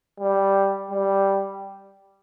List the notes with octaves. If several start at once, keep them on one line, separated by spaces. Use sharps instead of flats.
G3
G3